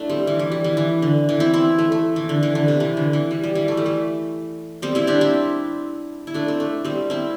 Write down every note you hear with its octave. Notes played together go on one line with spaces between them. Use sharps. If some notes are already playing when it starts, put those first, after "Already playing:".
Already playing: A3 D4 E4
G3 C4
E3
E3
G3
E3
E3
D3
E3
C4 E4
C4 E4
A3
A3
E3
D3
E3
D3
C3
E3
D3
E3
G3
G3
E3
A3
G3
A3
G3 C4
C4 E4
D4 G4
C4 E4
E4
A3 D4
C4
A3
G3 C4
C4 E4